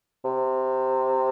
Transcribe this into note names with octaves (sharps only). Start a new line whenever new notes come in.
C3